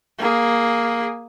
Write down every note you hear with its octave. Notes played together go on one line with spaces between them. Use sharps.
A#3 G#4